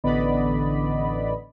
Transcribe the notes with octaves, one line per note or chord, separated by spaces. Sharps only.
A1 D3 B3 D5 D#5 B5